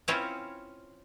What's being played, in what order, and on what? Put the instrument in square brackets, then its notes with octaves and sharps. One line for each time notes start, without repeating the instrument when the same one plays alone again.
[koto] C4 C#4 E4 F4 C5 C#5